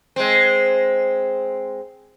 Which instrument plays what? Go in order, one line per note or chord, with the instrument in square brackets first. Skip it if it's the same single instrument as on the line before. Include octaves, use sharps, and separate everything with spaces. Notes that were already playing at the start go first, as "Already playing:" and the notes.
[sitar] G#3 C4